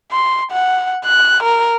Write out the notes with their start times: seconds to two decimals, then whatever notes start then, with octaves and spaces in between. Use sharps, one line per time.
0.12 C6
0.52 F#5
1.05 F#6
1.43 A#4